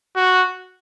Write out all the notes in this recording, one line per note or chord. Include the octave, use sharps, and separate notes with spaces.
F#4